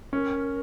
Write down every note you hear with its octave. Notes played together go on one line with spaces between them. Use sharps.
C#4 A#4